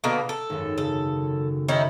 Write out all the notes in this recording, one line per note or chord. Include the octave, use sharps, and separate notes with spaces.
B2 D3 A#3
A4
G#1 F#2
C#3 A4
D#3 C#4 E4